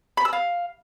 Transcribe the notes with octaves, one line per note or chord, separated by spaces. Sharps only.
B5
E6
F5